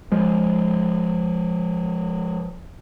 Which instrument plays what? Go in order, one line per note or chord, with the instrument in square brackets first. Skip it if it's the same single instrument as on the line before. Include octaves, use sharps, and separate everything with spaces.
[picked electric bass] F3 G#3